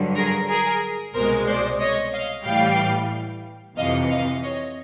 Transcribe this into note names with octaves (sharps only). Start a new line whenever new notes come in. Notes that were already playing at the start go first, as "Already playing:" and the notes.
Already playing: G2 D3 F#3
G#4 A#4
G#4 A#4
C2 B2 G#3 A#4 C5
C5 D5
C#5 D#5
D#5 F5
A2 E3 G3 F5 G5
F2 C3 E3 D#5 F5
D#5 F5
C#5 D#5